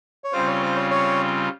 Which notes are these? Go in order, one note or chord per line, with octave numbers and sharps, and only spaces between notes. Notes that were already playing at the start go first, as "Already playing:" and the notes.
C#5
C#3 G3 C4 F4 C5
C#5
C5
C#5
C#5